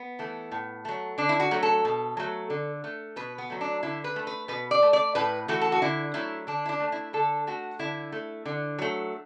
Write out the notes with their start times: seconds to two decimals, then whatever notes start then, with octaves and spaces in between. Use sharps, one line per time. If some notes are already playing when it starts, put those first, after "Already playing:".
Already playing: B3
0.19 E3 A3
0.52 A2
0.85 F#3 A3
1.18 D3 D4
1.29 E4
1.40 F#4
1.51 F#3 A3
1.63 A4
1.85 B2
2.17 F#3 A3
2.50 D3
2.84 A3
3.16 B2 B4
3.38 B3
3.50 F#3 A3
3.61 D4
3.83 D3 E4
4.04 B4
4.16 A3
4.27 B4
4.48 B2 B4
4.71 D5
4.82 A3
4.93 D5
5.15 A2 B4
5.48 E3 A3 F#4
5.61 A4
5.72 F#4
5.82 D3 E4
6.14 F#3 A3 E4
6.47 D3 D4
6.66 E4
6.69 D4
6.80 A3
6.92 E4
7.13 D3 A4
7.47 A3 F#4
7.79 D3 E4
8.12 A3
8.46 D3
8.79 F#3 A3